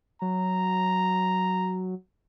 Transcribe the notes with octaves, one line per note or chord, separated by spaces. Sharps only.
F#3 A#5